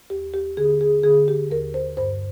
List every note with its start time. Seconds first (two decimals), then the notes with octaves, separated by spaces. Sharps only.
0.10 D#2 G4
0.34 G4
0.57 D3 G#4
0.81 G#4
1.03 D3 G#4
1.28 G4
1.51 D#2 A#4
1.74 C5
1.97 G2 C5